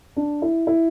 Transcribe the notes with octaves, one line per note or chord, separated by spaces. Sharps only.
D4
E4
E4